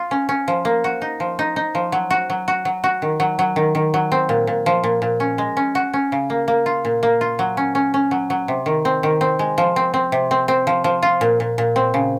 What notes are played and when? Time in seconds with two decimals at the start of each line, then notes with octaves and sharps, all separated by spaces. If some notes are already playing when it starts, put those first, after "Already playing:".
Already playing: F4
0.11 C#4
0.29 C#4
0.48 F3
0.65 A#3
0.84 F#4
1.02 D#4
1.20 F3
1.39 D#4
1.56 D#4
1.75 F3
1.92 F#3
2.10 F#4
2.30 F#3
2.48 F#4
2.65 F#3
2.84 F#4
3.02 D#3
3.20 F#3
3.39 F#3
3.56 D#3
3.75 D#3
3.94 F#3
4.12 C4
4.29 A#2
4.47 A#2
4.66 F3
4.84 A#2
5.02 A#2
5.20 C#4
5.38 G#3
5.57 C#4
5.75 F#4
5.93 C#4
6.12 C#3
6.30 A#3
6.48 A#3
6.66 F4
6.85 A#2
7.03 A#3
7.21 F4
7.39 F#3
7.57 C#4
7.75 C#4
7.94 C#4
8.11 F#3
8.30 F#3
8.48 C3
8.66 D#3
8.85 C4
9.03 D#3
9.21 C4
9.39 G#3
9.58 F3
9.76 C4
9.94 C4
10.12 C3
10.31 C4
10.48 C4
10.67 F3
10.84 F3
11.03 F4
11.21 A#2
11.40 A#2
11.58 A#2
11.76 C4
11.94 C#3